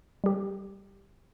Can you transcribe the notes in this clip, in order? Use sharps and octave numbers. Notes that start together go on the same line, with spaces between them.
G3 G4